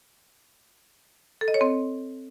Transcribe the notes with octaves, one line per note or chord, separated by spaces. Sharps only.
A4
D#5
C#5
C4